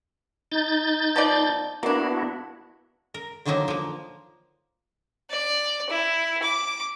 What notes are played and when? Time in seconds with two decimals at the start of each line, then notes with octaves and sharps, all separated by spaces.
0.52 D#4 G6 A6
1.16 F3 B3 D5
1.83 A#3 B3 D4 E4 F#4
3.14 A#4
3.45 D3 D#3 F3 F#3 A#3 D#4
3.68 F3 A#3
5.30 D5
5.90 E4
6.42 D6